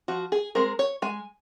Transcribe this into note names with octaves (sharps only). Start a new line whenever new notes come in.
F3 F#4
G#4
G#3 C4 A#4
C#5
G#3 G#5